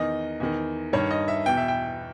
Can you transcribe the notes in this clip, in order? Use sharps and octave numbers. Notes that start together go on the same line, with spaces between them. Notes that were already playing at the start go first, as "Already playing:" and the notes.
Already playing: E2 D#3 D#5
E2 D#3
G2 D#3 C#5
D#5
E5
E2 B2 G5
E5
G5